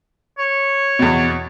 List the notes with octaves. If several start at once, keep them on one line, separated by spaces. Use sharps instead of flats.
C#5
E2 B2